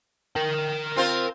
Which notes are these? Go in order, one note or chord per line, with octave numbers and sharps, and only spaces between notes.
A#4 G5
C4 F4 C5